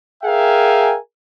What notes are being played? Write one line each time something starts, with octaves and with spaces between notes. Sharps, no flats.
G#4 A#4 E5 F5 G5 G#5